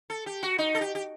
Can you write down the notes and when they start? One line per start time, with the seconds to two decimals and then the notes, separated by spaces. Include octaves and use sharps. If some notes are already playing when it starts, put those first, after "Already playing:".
0.10 A4
0.26 G4
0.43 F#4
0.58 D#4
0.75 A4
0.81 G4
0.95 G4